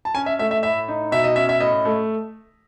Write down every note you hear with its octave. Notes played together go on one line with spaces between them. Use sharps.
A5
C#4 G#5
E5
A3 E5
E5
A2 E5
D#4
B2 E5
D#5
C#4 E5
E5
A2 D#5
A3